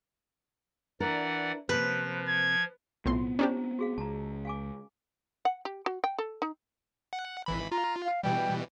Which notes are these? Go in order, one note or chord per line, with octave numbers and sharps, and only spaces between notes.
E3 D4 E4 A#4 D5 F#5
C3 F3 A#3 B4
G#6
B1 A2 B3 C4 E4 F4 C6
C#4 D4 E4 G4 C5 A#5
F#4 G#4 F5
C#2 A5 A#5
F5 G#5 D6
F#5
G4
F#4
G5
A4
D#4
F#5
G#1 E3 B5
F4 A#5
F5
B2 E3 G3 G5